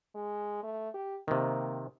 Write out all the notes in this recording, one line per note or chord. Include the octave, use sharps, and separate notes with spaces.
G#3
A3
G4
C3 D#3 A#3